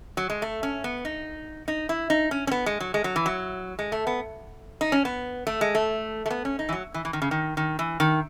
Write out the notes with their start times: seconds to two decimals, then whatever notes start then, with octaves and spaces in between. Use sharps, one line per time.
0.17 F#3
0.30 G#3
0.42 A3
0.63 C#4
0.84 B3
1.05 D#4
1.68 D#4
1.89 E4
2.10 D#4
2.31 C#4
2.47 C#4
2.51 B3
2.66 G#3
2.80 F#3
2.94 G#3
3.04 F#3
3.16 E3
3.26 F#3
3.79 G#3
3.92 A3
4.07 B3
4.81 D#4
4.92 C#4
5.05 B3
5.47 A3
5.61 G#3
5.75 A3
6.26 A3
6.30 B3
6.45 C#4
6.59 D#4
6.69 E3
6.72 F#3
6.94 E3
7.05 E3
7.13 D#3
7.22 C#3
7.31 D#3
7.57 D#3
7.79 E3
8.00 D#3